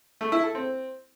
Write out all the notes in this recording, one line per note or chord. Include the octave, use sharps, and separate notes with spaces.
A3
E4
A4
C4